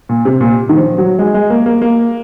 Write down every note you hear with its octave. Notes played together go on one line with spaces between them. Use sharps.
A#2
C3
A#2
D#3
F3
F#3
G#3
G#3
A#3
A#3
A#3